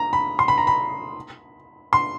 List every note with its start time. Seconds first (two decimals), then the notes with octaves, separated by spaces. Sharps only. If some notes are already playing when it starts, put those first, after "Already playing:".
Already playing: A#5
0.13 B5
0.39 C6
0.48 B5
0.58 A#5
0.67 B5
1.93 C6